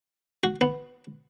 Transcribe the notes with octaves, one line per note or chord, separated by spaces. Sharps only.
F#4
B3